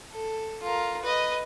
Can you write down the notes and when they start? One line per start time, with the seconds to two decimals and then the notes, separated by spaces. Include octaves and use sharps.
0.12 A4
0.63 F4 A#4
1.02 B4 D#5